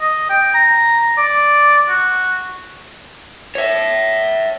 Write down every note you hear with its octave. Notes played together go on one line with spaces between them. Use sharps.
D#5
G5
A#5
D5
F#4
C#5 E5